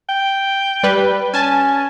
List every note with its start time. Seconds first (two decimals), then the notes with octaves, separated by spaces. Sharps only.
0.09 G5
0.83 G3 B4
1.34 C#4 G#5 A5